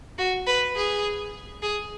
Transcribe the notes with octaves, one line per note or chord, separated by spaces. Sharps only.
F#4
B4
G#4
G#4